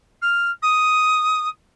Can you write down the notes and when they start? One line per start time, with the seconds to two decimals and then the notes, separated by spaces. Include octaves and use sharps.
0.22 F6
0.62 D#6